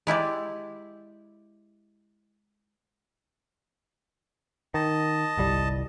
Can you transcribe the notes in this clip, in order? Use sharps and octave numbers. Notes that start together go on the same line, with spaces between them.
G#3 E4 G4 D5
D#3 D#5 A5
G1 C2 G3